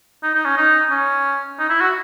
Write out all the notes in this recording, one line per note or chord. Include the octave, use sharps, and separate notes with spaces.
D#4
D#4
C#4
D#4
C#4
D#4
E4
F#4